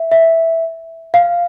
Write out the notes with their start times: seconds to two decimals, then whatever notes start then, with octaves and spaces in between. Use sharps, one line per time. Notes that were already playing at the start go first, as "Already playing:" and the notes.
Already playing: E5
0.12 E5
1.14 F5